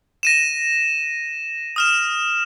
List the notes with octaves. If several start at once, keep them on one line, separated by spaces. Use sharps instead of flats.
A#6 D#7 E7
D#6 F6 E7